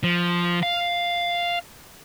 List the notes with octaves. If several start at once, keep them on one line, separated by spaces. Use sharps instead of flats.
F3
F5